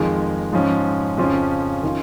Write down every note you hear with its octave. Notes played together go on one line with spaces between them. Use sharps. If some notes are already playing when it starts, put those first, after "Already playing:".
Already playing: F2 D#3 G#3 F4
G#2 F3 C#4
F2 C#3 F3 C#4 F4
D#3 C#4 F4